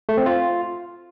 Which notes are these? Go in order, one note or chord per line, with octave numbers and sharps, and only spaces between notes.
A3
C4
F4